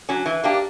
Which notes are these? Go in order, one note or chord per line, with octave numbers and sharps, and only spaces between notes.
F#3 C#4
E3
A#3 D4 G4